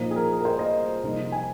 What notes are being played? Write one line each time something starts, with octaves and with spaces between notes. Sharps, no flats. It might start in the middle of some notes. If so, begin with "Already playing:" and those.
Already playing: A#2 F3 A#3 D#4
G#4
A#4
A#4
C5
D#5
C2 C3 F3 A#3 D#4
G#5